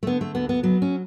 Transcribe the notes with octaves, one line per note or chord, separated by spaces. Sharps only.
A3
D3 B3
A3
D2 B3
B3
F#3 B3
C#4